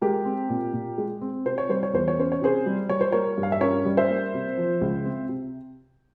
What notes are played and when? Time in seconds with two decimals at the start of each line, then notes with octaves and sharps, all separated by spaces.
0.01 G#3 G4 A#4
0.25 C4
0.50 A#2
0.73 A#2
0.98 G#3
1.21 C4
1.46 C3 C5
1.58 C#5
1.69 G3 C5
1.83 C#5
1.93 E2 C5
2.08 C#5
2.18 C#4 C5
2.32 C#5
2.42 C3 G#4 C5
2.66 G3
2.89 G3 C#5
3.01 C5
3.12 A#3 A#4 C#5
3.38 G2
3.43 F5
3.52 E5
3.61 C#4 A#4 C#5
3.85 G3
3.97 C5 E5
4.10 A#3
4.34 C3
4.57 F3
4.81 C#2
5.05 C4
5.29 C3